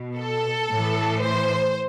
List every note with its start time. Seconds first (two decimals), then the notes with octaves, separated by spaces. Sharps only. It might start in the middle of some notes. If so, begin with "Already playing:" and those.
Already playing: B2
0.18 A4
0.70 A2 E3
1.22 C5